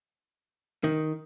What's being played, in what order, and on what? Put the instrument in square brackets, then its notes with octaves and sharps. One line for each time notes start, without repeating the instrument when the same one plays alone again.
[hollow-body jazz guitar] D#3